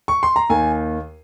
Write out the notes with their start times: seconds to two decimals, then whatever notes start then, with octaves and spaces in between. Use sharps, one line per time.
0.08 C#6
0.23 C6
0.36 A#5
0.49 D#2 D#3 G#5